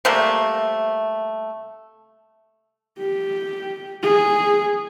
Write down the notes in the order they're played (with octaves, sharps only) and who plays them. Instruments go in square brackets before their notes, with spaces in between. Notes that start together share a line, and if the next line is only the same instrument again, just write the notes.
[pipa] C3 G3 A3 A#3
[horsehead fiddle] G4
G#4